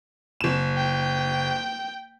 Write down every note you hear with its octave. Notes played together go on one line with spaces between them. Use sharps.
F#1 E7
G5